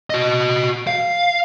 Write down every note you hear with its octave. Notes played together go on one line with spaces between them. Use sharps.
F#4 D#5
F5